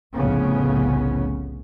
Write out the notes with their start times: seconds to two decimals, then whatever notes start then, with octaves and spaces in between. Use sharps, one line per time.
0.15 F1 C2 A2 C#3 B3 C#4